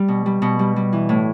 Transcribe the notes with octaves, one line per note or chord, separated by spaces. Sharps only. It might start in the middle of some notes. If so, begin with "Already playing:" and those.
Already playing: G3
B2
G3
B2
G3
G3
E3
A2